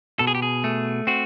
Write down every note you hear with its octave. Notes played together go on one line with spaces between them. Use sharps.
B2 A4
G#4
G4
G#4
A3
C4 F#4